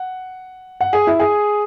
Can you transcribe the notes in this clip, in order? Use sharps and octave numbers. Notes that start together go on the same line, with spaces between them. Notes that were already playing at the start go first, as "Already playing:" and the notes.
Already playing: F#5
F#5
G#4
E4
G#4